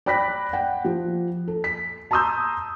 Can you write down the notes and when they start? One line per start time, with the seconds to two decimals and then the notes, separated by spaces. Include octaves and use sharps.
0.06 D5 G5 B5 F#6 A#6 B6
0.53 F#5 G5
0.85 F3
1.48 A4
1.64 B6
2.11 A5 A#5 C6 D#6 E6 G6